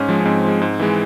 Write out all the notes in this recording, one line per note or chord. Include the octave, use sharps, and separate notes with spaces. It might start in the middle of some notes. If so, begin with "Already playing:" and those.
Already playing: G#2 C#4
F3 G#3
C#4
G#2 C4
F3 G#3
G#2
E3 G#3